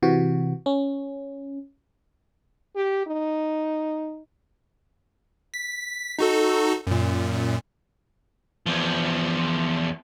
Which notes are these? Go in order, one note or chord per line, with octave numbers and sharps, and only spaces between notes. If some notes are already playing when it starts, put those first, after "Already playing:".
C3 E3 F#4
C#4
G4
D#4
B6
D#4 F#4 A4
F#2 A#2
E2 F3